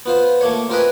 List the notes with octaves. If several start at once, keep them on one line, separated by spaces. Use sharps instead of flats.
B3 F4 C5
A3 A#3 C#5
C4 F4 A#4 B4 D#5 G#5